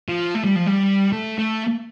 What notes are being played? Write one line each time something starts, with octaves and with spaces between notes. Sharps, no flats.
F3
A3
G3
F3
G3
A3
A3